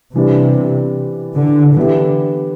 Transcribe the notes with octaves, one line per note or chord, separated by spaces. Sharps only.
C3 E3 G3 B3 D4
D3
D3 E3 B3 E4 G4